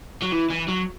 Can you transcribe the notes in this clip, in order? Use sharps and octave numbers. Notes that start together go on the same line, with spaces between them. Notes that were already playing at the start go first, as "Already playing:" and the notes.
F#3
E3
E3
F#3